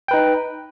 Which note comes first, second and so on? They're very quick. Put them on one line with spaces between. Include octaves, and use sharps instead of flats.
G5 B4 D#4